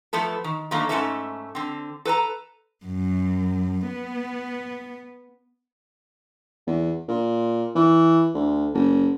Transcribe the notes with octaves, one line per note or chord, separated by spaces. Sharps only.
F3 A3 B3 A4
D#3
D3 D#3 F#3 A3 A#3
G#2 F#3 A3 C#4 A4 E5
D3 C4
A4 B4 A5 A#5
F#2
B3
E2
A#2
E3
D2
F#1